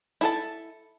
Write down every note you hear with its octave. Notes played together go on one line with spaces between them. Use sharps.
E4 A4 A5